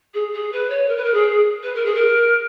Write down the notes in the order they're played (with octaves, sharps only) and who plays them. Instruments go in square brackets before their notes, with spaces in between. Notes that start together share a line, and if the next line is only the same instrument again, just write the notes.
[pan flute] G#4
G#4
B4
C#5
A#4
B4
A#4
G#4
B4
A#4
G#4
A#4